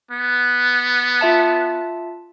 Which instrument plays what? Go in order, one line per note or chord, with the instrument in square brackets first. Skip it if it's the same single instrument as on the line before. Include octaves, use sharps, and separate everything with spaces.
[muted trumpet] B3
[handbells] F4 E5 A5